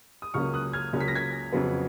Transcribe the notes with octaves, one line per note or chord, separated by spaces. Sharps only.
D#6
C#2 C#3 F#3 A#3 C#4 C#6 F6
D#6 F#6
F6 G#6
C#2 C#3 F#3 A#3 C#4
B6
A#6
G#6 B6
F2 C#3 F#3 B3